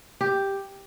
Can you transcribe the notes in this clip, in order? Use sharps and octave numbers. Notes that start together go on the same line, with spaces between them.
G4